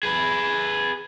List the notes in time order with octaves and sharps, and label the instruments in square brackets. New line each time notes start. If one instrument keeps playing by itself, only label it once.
[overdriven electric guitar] G#4 B4